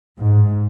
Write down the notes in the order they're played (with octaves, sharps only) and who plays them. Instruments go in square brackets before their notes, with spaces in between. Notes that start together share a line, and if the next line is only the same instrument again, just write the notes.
[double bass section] G#2